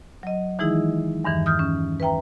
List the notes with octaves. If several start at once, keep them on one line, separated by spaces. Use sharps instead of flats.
F#3 D#5
D#3 E3 G#3 D#4 E4 G#4
E2 G2 D#3 E3
D#6 F6 G6
C#4
B4 E5 G5 A#5